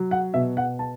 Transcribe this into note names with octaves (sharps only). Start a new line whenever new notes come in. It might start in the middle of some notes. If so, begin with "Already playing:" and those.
Already playing: F#3
F#5
B2 E5
F#5
A5